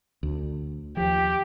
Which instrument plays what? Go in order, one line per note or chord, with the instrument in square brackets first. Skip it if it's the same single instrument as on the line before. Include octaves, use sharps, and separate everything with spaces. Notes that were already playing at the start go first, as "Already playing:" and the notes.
[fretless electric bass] D2
[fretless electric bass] D#2 F3 [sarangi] G4